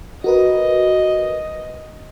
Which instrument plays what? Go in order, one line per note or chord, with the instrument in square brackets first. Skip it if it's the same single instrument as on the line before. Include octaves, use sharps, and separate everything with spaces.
[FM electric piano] F#4 A#4 B4 [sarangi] D#5